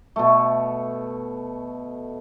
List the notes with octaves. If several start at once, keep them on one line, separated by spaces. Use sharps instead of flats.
B2 A3